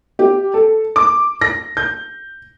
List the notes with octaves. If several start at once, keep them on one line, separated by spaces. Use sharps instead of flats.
G4
A4
D6
A#6
G6